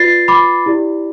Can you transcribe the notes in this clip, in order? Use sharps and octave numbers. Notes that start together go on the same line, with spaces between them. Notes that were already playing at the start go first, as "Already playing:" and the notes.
Already playing: F4 B4 D5 A6 C7
B5 D6
E4 G4 D5